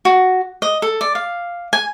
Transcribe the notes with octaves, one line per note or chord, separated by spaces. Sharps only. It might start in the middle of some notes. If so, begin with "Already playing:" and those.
F#4
D#5
A4
D5
F5
G#5